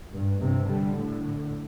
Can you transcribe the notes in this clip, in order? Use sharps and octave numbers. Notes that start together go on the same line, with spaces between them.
G2
G2 C3
D3 G3
A2 D3